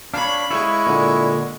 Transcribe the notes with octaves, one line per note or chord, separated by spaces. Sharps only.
D4 C#5 F5 B5
G#3 E4 C#5 C#6
A#2 D3